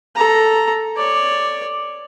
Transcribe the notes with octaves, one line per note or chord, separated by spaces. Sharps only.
A4 A#5
C#5 D5